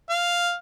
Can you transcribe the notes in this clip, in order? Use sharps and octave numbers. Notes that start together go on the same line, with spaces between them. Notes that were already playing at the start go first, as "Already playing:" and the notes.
F5